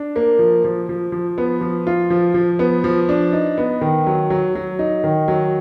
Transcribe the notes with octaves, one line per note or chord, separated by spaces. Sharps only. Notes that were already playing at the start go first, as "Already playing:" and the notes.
Already playing: D4
A#3
F3
F3
F3
F3
B3
F3
F4
F3
F3
B3
F3
D4
D#4
B3
D#3
F#3
F#3
F#3
D#4
D#3
F#3